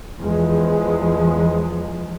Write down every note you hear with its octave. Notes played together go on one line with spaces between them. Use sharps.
E2 F3 G#3